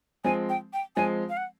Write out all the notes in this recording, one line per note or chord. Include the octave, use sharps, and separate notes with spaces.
F3 G#3 C4 G#5
G5
G5
F3 G#3 C4 G#5
F5
F#5